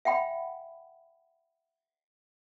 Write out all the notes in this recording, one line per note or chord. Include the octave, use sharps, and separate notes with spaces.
E5 F#5 G5 B5